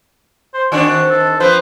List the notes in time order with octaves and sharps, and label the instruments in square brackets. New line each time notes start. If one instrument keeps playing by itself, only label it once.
[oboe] C5
[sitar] D#3 C4 D4 [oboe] F#4
[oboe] A4
[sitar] F3 C4 B4 [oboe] C5